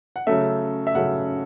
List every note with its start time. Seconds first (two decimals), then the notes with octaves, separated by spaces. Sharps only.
0.16 F#5
0.27 C#3 F#3 A3 E5
0.87 E5
0.95 C#3 F#3 A3 F#5